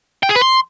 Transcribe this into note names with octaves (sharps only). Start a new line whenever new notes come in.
G5
G#4
B4
C6